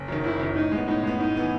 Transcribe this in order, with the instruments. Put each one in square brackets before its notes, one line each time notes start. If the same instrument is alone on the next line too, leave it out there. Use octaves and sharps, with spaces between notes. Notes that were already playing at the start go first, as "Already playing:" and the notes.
Already playing: [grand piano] F#1
F#2 D#3
[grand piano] F#1 [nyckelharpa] E4
[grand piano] F#2 D#3
[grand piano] A2 [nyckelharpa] D#4
[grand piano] G#3 B3
[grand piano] A2 [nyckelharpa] D#4
[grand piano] G#3 B3
[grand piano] A2 [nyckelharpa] D#4
[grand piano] E3 B3